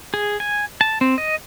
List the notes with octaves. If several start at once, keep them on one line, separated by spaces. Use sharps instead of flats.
G#4
G#5
A5
C4
D#5